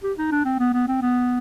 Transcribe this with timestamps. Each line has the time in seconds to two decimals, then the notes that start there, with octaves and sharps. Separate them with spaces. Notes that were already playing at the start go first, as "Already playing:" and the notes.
0.03 G4
0.18 D#4
0.32 D4
0.45 C4
0.59 B3
0.73 B3
0.88 C4
1.02 B3